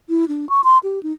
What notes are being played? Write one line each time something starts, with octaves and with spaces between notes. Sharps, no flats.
E4
D4
C#6
C6
G4
D#4